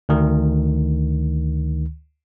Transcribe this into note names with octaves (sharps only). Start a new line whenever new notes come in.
D2 D#3